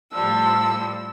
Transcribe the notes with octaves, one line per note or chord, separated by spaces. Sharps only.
A2 F3 G3 A5 E6